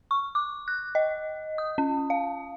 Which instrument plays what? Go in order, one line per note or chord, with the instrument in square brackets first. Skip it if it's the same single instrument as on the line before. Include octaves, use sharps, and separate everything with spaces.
[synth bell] C#6
D6
F#6
D#5
D#6
C#4
F5